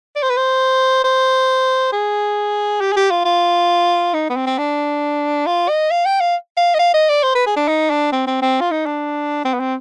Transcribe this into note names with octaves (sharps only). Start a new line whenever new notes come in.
D5
C5
B4
C5
C5
G#4
G4
G#4
G4
F4
F4
D#4
B3
C4
C4
D4
F4
D#5
F5
G5
F5
F5
D#5
F5
D#5
D5
C5
B4
G#4
D4
D#4
D4
C4
C4
C4
F4
D#4
D4
C4
B3
C4